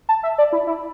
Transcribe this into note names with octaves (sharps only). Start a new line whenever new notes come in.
A5
E5
D5
E4
E4